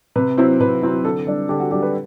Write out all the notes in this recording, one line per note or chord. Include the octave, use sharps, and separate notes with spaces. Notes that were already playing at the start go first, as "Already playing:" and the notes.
C3 B4
F#3 C4 E4 C5
C3 B4
F#3 C4 E4
D3 A4
G3 D4
D3 G4
F#4
G3 D4 G4
B4